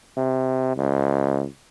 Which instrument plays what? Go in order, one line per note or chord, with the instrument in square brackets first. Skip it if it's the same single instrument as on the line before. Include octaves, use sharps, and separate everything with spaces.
[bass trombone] C3
C#2